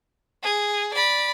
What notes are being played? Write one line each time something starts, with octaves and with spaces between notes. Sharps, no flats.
G#4
D5 B5